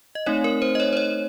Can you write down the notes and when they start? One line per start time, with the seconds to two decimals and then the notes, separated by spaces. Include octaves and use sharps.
0.15 D#5
0.26 A3 C4 D#4 C#5
0.44 A#4
0.62 C5
0.75 D#5
0.80 C#5
0.93 C5
0.97 C#5